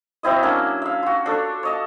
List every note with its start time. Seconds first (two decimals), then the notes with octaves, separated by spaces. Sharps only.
0.23 F#3 C4 E4 D#5
0.43 A#3 C#4 D4
0.82 E5 F5
1.03 F4 F#4
1.26 D4 A4 C#5
1.63 C#5 D#5 A5